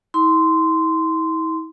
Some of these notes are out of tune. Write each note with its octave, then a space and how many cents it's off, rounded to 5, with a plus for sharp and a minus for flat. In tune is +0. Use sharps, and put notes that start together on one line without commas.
E4 -45 C6 -15